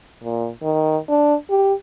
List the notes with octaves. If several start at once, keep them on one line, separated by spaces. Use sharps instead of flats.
A#2
D#3
D4
G4